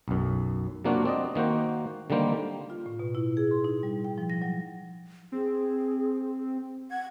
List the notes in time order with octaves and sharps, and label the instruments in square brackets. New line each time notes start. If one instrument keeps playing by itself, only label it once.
[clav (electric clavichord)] B1 F#2
C3 F#3 A#3 D4 F4 F#4
C4 D5 D#5
D#3 A#3 F#4 C5
D3 D#3 G3 A#3 C5
[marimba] F4
A2
B2
E4
G#4
C6
D#4
G3
G5
F3
A#6
F#3
[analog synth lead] C4 [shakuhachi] G#4
[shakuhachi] F#5 [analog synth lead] G#6